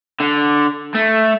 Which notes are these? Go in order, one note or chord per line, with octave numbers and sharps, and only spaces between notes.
D3
A3